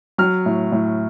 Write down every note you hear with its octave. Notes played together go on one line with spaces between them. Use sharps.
F#3 F6
A2
A2